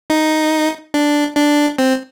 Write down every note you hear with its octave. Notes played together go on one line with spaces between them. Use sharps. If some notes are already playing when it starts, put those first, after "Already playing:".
D#4
D4
D4
C4